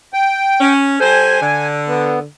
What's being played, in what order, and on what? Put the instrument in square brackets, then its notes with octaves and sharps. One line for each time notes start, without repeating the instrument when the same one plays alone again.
[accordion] G5
[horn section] C#4
[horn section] G3 A4 C5 [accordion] G#5
[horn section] D3
[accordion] B3